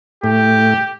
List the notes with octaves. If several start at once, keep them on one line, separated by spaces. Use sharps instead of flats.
A2 G4